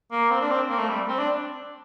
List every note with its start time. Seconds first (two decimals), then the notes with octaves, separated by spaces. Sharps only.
0.12 A#3
0.31 C4
0.41 D4
0.51 C4
0.70 A#3
0.79 A3
0.89 G3
1.09 C4
1.18 D4